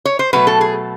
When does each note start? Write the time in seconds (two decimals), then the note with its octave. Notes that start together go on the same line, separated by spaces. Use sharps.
0.05 C#5
0.19 C5
0.33 B2 F#3 A3 B4
0.47 A4
0.61 G#4